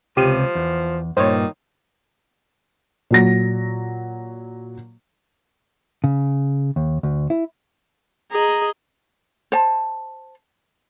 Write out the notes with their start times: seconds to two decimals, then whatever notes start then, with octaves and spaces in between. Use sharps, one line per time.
0.17 C#2 C3 F3 G4 D#7
0.55 E2
1.17 G2 A#2 D#3 C5 C#5
3.11 A#2 F#3 A#6
6.04 C#3
6.76 D#2
7.03 D2
7.30 E4
8.32 G#4 D#5 A#5
9.52 C5 A5